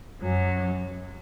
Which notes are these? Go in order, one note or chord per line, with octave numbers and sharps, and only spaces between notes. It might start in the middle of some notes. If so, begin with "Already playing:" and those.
F#2 F#3